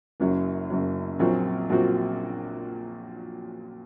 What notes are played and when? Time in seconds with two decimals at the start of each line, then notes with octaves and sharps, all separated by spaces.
0.20 F#1 F#2 F#3
0.70 F#1 F#2 F#3
1.19 A#1 A#2 F#3 C4 F#4
1.69 A#1 A#2 F#3 C4 F#4